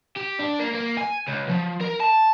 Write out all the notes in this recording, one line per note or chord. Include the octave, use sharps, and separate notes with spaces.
G4
D4
A#3
A#3
G#5
C#2
F3
A#4
A5